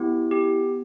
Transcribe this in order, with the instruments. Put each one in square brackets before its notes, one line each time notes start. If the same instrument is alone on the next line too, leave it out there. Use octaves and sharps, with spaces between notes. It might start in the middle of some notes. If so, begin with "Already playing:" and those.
Already playing: [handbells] B3 E4 G4
G4